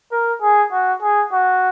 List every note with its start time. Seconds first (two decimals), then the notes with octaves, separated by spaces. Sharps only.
0.12 A#4
0.42 G#4
0.72 F#4
1.02 G#4
1.32 F#4